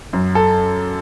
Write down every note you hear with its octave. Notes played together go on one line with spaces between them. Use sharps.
F#2
A4